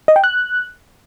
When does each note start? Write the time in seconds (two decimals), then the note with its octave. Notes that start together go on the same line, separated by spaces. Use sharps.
0.08 D#5
0.16 G5
0.24 F#6